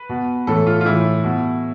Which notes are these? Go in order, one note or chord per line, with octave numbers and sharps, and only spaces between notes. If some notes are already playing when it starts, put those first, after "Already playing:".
Already playing: B4
B2
A2 E3 A4
F4
F4
A2 E3 E4
B2